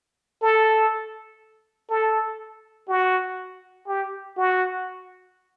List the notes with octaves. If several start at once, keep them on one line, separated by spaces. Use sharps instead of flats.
A4
A4
F#4
G4
F#4